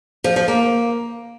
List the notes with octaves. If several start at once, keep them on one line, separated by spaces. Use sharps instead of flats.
F3
F3
A#3